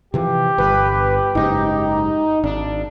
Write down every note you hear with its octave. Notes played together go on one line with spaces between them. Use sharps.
C3 E3 F3 G4
G1 B4
F#1 G#2 D#4
G#1 D4